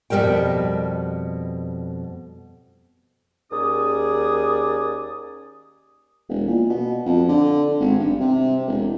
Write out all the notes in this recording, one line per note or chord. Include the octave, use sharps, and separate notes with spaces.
F2 B2 F#3 G3 A#4 G5
D#2 C#4 G#4 D5 D#6
E1
A#2
B2
F2
D3
G#1
G2
C3
E1